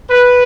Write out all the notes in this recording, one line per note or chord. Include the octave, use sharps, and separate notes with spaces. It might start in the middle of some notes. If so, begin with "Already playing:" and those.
B4